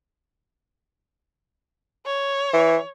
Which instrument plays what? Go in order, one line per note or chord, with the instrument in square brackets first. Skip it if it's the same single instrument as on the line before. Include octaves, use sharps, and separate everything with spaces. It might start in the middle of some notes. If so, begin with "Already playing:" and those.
[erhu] C#5
[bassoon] E3